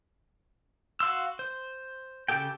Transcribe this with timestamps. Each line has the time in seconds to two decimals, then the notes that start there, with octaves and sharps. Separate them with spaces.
1.00 F#4 F5 C6 E6
1.39 C5
2.28 C#3 A3 G4 A4 G5